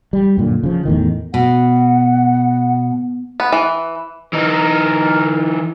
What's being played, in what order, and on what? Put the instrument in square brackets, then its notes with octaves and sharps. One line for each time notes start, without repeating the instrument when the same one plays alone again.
[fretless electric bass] G3
F#2 A#2 D3
C#3 F3
E2 A2 D#3
[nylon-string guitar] B2 [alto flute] F#5
[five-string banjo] B3
E3
[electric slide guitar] E3 D#4 [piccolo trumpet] A#4